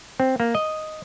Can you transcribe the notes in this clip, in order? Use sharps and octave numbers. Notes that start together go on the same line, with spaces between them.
C4
A#3
D#5